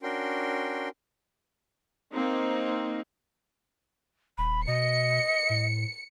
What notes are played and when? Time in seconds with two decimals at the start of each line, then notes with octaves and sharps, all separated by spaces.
0.03 C#4 D4 F#4 A#4 G5 C6
2.14 A#3 C4 D#4
4.38 D#1 B5
4.67 B2 D#5 C#7
5.50 A2